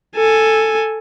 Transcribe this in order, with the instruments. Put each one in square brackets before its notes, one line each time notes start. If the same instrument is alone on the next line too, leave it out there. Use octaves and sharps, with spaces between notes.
[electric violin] A4 G#5